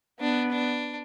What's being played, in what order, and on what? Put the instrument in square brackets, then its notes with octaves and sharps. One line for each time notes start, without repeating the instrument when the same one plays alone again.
[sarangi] B3 [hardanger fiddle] D4
[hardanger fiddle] D4